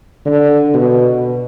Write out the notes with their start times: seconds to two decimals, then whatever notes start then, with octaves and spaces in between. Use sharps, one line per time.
0.26 D3
0.74 B2